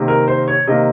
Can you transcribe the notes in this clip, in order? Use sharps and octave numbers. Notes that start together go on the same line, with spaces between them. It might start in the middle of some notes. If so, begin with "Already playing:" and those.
Already playing: C3 D#3 A#3
A#4
C5
C#5
C3 D#3 A#3 D#5